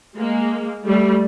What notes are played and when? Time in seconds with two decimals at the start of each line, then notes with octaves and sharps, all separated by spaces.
0.17 G#3 A#3
0.86 G3 A3